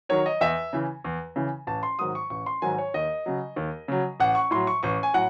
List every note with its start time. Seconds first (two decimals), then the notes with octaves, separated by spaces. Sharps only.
0.09 D#3 F#3 C#5
0.26 D#5
0.41 E2 E5
0.73 C#3 E3
1.04 E2
1.36 C#3 E3
1.67 A1 A5
1.83 C6
1.99 G#2 D#3 F#3 D#6
2.15 C#6
2.30 A1 C#6
2.46 C6
2.62 G#2 D#3 F#3 G#5
2.78 C#5
2.94 D#2 D#5
3.26 C#3 F#3
3.56 D#2
3.88 C#3 F#3
4.20 A1 F#5
4.35 C#6
4.51 A2 F#3 C6
4.67 C#6
4.83 A1 C#6
5.03 G#5
5.14 A2 F#3 F#5